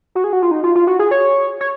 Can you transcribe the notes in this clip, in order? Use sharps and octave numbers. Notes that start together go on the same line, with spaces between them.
F#4
G#4
F#4
F4
D#4
F4
F4
F#4
G#4
C#5
C#5